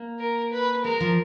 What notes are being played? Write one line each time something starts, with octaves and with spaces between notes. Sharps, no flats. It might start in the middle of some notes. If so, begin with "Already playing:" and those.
Already playing: A#3
A#4
B4
G#3 A#4
F3